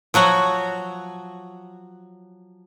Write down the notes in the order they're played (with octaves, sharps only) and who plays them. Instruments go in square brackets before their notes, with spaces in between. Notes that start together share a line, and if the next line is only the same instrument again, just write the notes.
[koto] F3 F#3 F#4 C#5